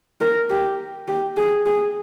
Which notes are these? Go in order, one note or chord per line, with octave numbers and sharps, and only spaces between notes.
A#4
G4
G4
G#4
G#4